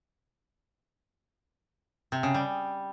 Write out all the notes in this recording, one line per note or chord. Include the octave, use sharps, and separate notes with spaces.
C3
C#3
G3